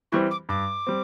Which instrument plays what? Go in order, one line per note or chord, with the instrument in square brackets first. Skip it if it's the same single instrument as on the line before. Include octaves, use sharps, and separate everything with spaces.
[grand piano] E3 G3 C4 [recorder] C#6
[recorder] D6
[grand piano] G2 [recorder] D6
[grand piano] G3 C4